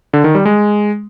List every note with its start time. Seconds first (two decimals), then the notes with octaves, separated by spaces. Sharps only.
0.13 D3
0.24 D#3
0.35 G3
0.45 G#3